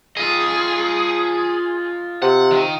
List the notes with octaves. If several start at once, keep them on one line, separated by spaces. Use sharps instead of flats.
F4 G#4 D#5
C3 F#5
D#3